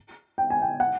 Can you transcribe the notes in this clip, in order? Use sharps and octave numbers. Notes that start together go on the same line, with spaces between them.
G5
G#5
G5
F#5